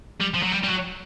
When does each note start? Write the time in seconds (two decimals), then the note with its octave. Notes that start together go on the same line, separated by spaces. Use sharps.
0.20 G3
0.34 F3
0.43 F#3
0.52 G3
0.63 G3
0.68 F#3